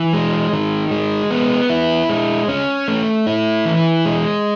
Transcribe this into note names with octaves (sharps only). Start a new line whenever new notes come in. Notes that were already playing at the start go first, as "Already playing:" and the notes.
Already playing: E3
G#3
D#3
G#3
B3
E4
G#3
C#4
A3
E4
E3
G#3